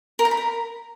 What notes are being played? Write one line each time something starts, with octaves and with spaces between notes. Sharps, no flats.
A#4
A#5
B5
A#4